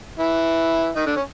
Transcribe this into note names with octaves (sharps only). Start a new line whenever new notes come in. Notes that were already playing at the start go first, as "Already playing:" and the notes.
E3 E4
D#3 D#4
D3 D4
C#4